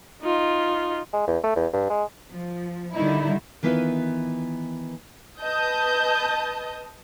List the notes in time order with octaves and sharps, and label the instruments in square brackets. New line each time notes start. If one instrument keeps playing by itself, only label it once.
[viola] D#4 F4
[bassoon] G#3
E2
A3
E2
G2
G#3
[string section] F3
D3 D#3 G3 D#4 E4
[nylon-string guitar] D#3 E3 B3 E4 F4 B4
[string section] B4 D#5 A5 D#6 G6